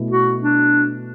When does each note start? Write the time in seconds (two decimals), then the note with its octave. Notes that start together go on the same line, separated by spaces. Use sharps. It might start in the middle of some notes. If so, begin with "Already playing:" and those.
Already playing: B2 A3 E4
0.10 F#4
0.43 D4